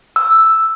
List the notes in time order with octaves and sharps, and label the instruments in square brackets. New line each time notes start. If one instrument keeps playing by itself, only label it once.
[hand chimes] E6